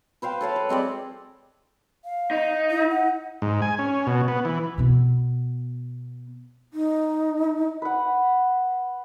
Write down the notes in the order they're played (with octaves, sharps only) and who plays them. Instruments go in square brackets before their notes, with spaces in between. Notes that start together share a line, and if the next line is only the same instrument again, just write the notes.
[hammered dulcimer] B4 C5 F5 G5
A4 C#5 F5 B5
B4
G#3 C4 G4 D5
[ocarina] F5
[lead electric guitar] D#4
[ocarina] E4
F#5
[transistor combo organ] G#2
G#5
C#4
B2
B3
E3
[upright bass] B2 B3
[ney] D#4
[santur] B4 F#5